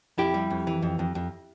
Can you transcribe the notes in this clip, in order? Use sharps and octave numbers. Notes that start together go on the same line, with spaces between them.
F2 E4 G4
G3
F2
E3
F2
F2
F2